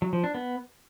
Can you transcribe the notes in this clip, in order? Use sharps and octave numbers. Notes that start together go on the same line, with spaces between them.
F#3
F3
D4
B3